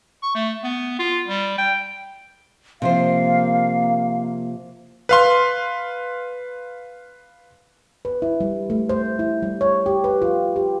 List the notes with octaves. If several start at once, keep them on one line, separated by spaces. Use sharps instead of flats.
C#6
A3
B3
F4
G3
G5
C3 F3 A#3 C5 F5
B4 F5 C6
B4
E4
G3
A3
C5
E4
G3
C#5
G4
B4
F4
G4